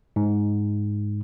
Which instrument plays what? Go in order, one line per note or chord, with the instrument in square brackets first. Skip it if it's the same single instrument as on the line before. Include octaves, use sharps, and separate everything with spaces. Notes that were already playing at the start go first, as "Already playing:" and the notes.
[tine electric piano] G#2